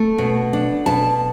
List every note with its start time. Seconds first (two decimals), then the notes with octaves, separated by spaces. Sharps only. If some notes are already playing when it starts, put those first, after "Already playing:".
Already playing: A3
0.18 B2
0.53 D4
0.86 B2 A5